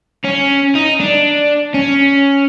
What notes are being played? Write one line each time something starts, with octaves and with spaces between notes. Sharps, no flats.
C#4
D#4
D4
C#4